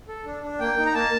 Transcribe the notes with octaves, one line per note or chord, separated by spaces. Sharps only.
A4
D4
D4
A#3 G5
D#4
A#5
A#3 A5